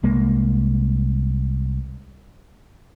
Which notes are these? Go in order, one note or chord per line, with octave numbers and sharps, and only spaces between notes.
C2 G#3 A#3